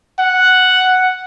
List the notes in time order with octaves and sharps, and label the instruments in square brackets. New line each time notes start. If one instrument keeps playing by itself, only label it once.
[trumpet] F#5